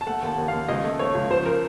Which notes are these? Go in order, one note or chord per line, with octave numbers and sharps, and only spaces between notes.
A5
A3 F#5
D#2 A5
D#2
D#2 F5
C#2 D#5
A3
A3 C#5
C#2
F3 C5
A#4